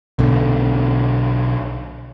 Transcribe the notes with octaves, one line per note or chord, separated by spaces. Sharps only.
B1 B2 D3